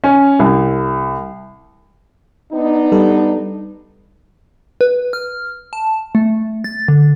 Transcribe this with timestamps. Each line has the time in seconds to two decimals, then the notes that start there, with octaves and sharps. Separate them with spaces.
0.04 C#4
0.39 C2
2.53 B3 D4 D#4
2.92 G3 A4 B4
4.81 B4
5.13 F6
5.73 A5
6.15 A3
6.64 A6
6.88 D3